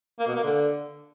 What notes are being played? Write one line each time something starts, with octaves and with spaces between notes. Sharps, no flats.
A#3
B2
A#3
D3